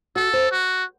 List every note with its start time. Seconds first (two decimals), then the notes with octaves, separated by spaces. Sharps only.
0.16 F#4 A4
0.33 C5
0.52 F#4